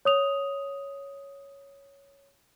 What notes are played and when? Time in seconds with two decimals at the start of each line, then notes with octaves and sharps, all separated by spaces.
0.05 C#5 D#6 F7